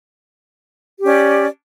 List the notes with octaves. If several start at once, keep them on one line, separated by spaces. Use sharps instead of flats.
C#4 G4 D5